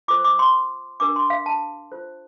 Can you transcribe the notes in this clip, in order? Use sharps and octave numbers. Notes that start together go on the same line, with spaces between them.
F4 A4 C5 D6
D6
C6
D4 G4 A#4 D6
C6
F5
A5
F4 A4 C5